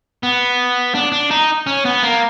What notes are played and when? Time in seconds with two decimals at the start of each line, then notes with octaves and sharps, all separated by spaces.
0.23 B3
0.95 D4
1.12 D4
1.31 D#4
1.67 C#4
1.85 B3
2.03 A#3